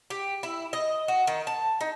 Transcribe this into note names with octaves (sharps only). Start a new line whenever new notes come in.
G4
E4
D#5
F#4
D#3
A5
D#4